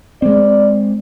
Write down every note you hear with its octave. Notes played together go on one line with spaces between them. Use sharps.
G#3 C4 D5